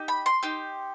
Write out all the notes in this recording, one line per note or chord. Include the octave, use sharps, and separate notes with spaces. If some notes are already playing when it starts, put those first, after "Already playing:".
Already playing: D#4 G4
B5
C6
D#4 G4